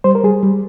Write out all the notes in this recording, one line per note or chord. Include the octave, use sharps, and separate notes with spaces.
G3 C5
A#4
G3 G#4
G3